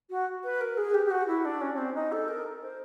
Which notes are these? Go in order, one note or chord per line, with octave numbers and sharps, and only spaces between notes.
F#4
B4
A#4
G#4
G4
G4
F#4
E4
D4
C#4
C#4
C4
D#4
A4
A#4
C5